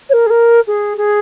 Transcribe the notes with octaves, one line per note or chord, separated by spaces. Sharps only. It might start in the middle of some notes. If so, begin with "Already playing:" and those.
C#5
A#4
G#4
A#4
G#4
G#4